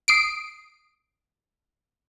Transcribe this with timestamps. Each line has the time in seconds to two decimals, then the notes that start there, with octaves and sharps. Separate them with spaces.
0.08 D#6 C7 D7